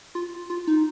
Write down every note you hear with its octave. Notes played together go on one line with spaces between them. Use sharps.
F4
F4
D#4